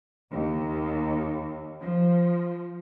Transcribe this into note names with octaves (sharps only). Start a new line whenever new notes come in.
D#2
F3